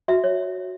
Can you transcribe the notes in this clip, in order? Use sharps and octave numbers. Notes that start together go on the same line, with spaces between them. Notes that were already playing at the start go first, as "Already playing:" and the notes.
F#4 E5
C#5